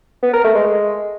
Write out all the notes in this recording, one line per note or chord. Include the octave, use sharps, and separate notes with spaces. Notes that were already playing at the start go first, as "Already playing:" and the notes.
B3
A#4
A3
G#3